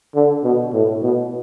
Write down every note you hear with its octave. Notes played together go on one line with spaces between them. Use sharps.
D3
B2
A2
B2